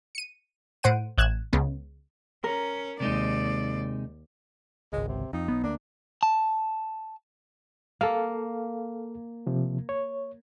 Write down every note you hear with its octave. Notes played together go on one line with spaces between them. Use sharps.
C#7 D#7
A2 C5 F#5 D7 D#7
A1 F#6 G#6 E7
C#2 C#3 B3
C#4 A#4
D#2 C3 G#3 D#4 D5
G#1 C#2 G#3
C3
F2 D#4
B1 B3
D2 A#3 D4
A5
A#3 A4 F5
C3 F3
C#5